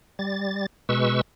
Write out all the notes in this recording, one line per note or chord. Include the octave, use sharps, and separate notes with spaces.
G3 A6
B2 G#3 B4 C#6 E6